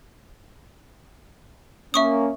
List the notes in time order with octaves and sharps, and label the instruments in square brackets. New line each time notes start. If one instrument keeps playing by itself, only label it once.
[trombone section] A#3 C#4 [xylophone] E5 C#6 D#6